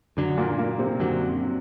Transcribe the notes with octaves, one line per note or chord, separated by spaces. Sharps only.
F#2 D3 F#3
A#2 A#3
A#2 A#3
C3 C4
F#2 D3 F#3